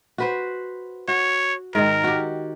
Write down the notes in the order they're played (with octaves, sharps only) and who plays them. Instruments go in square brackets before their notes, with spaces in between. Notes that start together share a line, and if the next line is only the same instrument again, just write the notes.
[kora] F#4 B4 C5
[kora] F#4 [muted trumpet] C#5
[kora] G#2 D#3 [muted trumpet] A#4
[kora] F#4 G4